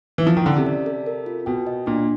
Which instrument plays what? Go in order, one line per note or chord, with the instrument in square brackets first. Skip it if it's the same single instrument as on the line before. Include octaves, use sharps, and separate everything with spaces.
[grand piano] E3
[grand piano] F3 [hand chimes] E4
[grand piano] D#3
[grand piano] D3 [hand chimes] C#4
[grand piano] C3
[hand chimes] D5
A4
A#4
F4
[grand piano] B2 [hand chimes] G5
[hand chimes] D#5
[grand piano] A#2 [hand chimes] D4